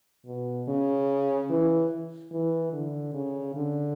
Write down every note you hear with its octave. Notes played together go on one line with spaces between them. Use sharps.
B2
C#3
E3
E3
D3
C#3
D3